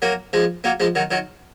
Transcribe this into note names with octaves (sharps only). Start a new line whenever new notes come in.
F#3 A#3
F3 G#3
F#3 A#3
F3 G#3
D#3 F#3
D#3 F#3